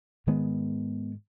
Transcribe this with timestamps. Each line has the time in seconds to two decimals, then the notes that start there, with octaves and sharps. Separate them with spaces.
0.27 G#2 D#3 G#3 B3